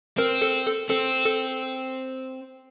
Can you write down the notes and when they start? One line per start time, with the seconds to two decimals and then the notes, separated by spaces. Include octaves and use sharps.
0.18 C4 A#4
0.42 A4
0.66 A4
0.89 C4 A4
1.26 A4